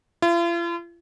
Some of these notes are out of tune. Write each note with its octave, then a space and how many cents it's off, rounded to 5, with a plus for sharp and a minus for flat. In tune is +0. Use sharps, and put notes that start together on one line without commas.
F4 -45